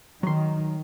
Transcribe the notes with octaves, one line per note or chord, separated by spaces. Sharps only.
D#3 F#3 C6